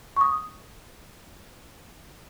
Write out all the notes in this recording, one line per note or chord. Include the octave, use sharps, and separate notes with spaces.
C#6 D#6